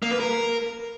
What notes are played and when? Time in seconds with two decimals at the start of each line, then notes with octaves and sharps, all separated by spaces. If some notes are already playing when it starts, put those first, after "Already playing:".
0.02 A#3
0.11 B4
0.20 A#4